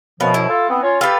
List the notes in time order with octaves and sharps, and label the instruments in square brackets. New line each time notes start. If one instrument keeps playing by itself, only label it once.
[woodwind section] F#2 B2 F3 [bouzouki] B3 F5
[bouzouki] E4
[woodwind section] F4 A4
B3 C4
C#4 F4 C#5
[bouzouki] F4 B4 [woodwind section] G4 A4